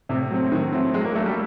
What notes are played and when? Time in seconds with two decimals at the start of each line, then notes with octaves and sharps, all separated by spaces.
0.09 A2 C3
0.31 F#3 A3 C4
0.52 A2 D#3
0.73 E3 F#3 A3 C4
0.94 F#3 G#3
1.05 A#3
1.15 A3 A#3 D4 F#4 A4
1.26 G3